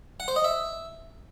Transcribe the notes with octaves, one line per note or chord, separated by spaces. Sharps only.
F#5
C5
D#5
E5